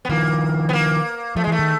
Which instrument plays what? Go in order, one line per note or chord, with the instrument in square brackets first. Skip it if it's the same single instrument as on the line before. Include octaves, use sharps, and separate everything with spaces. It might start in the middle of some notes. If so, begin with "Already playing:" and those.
[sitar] B3
[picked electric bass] D#3 F3 [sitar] A#3
[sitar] B3
A#3
[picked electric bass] F3 [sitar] A3
[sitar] G#3
[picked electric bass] E3 [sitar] A3
[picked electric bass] D#3